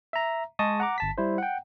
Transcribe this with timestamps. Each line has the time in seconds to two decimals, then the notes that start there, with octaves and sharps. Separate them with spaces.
0.13 E5 A#5
0.59 G#3 G#4 D#5 A5 C#6 D#6
0.80 F#5 A#5 D6
0.98 G1 A5 B6
1.18 G3 E4 C5
1.38 F#5 G5